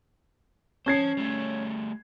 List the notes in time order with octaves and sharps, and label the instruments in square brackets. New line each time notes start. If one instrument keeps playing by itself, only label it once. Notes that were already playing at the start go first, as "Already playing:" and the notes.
[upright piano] C#4 G#6 C7 [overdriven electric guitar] C5 A5
[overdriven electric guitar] G3 A3